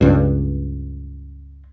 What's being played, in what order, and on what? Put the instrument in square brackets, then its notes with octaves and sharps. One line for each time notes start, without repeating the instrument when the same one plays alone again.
[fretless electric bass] C#2 G2